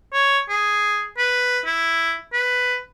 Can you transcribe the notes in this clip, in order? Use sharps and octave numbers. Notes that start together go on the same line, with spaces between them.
C#5
G#4
B4
E4
B4